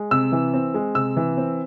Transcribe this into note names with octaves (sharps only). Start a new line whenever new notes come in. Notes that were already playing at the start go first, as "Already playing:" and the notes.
Already playing: G#3
C3 E6
E3
C4
G#3
C3 E6
E3
C4